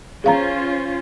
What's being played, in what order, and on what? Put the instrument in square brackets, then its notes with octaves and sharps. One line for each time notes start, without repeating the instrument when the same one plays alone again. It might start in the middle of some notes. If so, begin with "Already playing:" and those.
[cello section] C#4 F4 C5 [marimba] G#4 F5 A#5